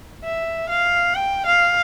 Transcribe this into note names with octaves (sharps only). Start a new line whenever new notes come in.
E5
F5
G5
F5